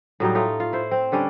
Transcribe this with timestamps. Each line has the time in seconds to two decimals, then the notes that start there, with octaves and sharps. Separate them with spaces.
0.20 A2 F#3 G3 D#4
0.35 A3 D#4 F4
0.60 F4
0.73 E4 C5
0.91 C4
1.12 D3 G3 C#4 D4